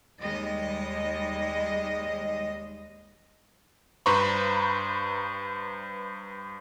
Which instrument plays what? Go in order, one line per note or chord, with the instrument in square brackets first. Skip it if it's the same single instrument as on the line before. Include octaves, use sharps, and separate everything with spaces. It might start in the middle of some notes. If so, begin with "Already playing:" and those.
[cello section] D#2 G3 G#3 D#5
[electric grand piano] G2 B4 C5 A#5 B5 C#6